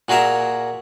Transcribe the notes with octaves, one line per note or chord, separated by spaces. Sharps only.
A#2 F#4 G#4 A#4 E5